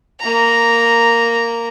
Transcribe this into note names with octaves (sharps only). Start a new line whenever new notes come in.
A#3 A#5